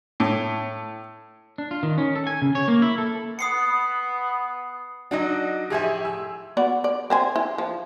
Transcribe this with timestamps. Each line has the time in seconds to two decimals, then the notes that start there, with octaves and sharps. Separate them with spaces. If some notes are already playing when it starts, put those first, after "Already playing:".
0.20 A2
1.58 D4
1.71 F4
1.83 D#3
1.98 C#4
2.16 A4
2.27 G#5
2.42 C#3
2.55 C#5
2.68 A#3
2.82 E4
2.98 A4
3.39 B3 D#6 C7 C#7
5.11 F#3 D4 D#4 F#4 D#5
5.70 A2 F3 G4 G#4 E5 G#5
6.05 E6
6.57 B3 F#4 D5
6.84 D5
7.10 C4 C5 G#5
7.36 E4
7.58 F3